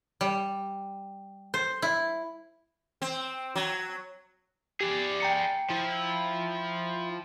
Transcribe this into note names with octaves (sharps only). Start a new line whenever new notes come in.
G3
C5
E4
C4
F#3
G4 G#4 D5
G5 A#5 C#7
F3 E4